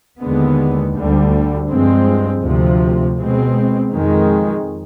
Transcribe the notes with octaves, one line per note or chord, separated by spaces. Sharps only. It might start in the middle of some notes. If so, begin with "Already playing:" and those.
D#2 D3 G#3 B3
D2 D3 G3
G2 F3 G#3 C4
D2 C3 F3
B2 G#3 C4
F2 D#3 G#3